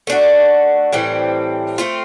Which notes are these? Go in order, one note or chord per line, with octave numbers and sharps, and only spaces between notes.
A3 D4 F#4
A2 E3 G3 C4
A3 C4 F4